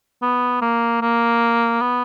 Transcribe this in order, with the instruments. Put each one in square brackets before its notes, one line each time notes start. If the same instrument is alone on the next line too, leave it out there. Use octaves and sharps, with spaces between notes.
[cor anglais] B3
A#3
A#3
B3